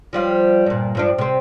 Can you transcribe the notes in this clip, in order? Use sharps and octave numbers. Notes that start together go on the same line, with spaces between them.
F3 G3 F4
G2 A#2
G2 F3 D4
C3 C4